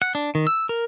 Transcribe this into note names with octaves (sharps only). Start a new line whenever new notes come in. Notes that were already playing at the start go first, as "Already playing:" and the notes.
F#5
D4
D#3
E6
A#4